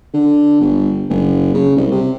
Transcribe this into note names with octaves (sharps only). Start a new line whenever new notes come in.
D3
G1
F#1
C#3
C2
C3